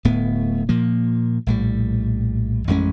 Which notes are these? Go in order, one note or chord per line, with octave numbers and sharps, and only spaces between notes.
D1 A2 B3
A#2 F3 A#3
A#1 A2 G3
A1 F2 G#3 C#4